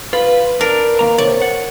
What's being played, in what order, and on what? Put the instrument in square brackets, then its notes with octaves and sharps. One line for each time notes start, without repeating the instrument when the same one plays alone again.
[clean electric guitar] F4 [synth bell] B4
[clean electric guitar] D4 [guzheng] A#4
[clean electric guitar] D#3 A#3 A#5
[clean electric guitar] C3 [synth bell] C#5 A6 [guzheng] D5
[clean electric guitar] F#5